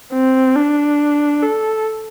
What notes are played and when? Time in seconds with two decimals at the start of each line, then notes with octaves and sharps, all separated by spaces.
0.13 C4
0.56 D4
1.42 A4